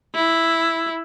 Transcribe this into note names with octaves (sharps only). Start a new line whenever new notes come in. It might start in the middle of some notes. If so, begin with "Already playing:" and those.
E4